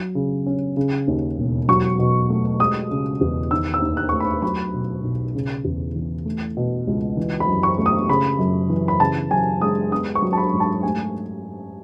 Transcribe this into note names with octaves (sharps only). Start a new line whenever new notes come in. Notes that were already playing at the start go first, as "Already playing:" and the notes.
Already playing: F#3
C#3
C#4
C#3
D#2
E1
F#3 C#6
B2
A3
G#3 D#6
C#3
E2
D#3 E6
E6
D#2
F#6
A3 C#6
B5
F#3 B5
B2
B1
C#3
E2
E3
A3
B2
C#2
E3
B5
F#2
C#6
A3
D#6
C#3 B5
F#2
E3
B5
C#3 A5
F#2 G#5
G#3 D#6
B3 D#6
C#6
F#3
A5
B5
G#2
A5
A3 G#5